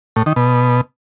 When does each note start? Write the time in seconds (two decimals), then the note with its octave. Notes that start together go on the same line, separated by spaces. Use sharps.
0.16 A2
0.26 D#3
0.36 B2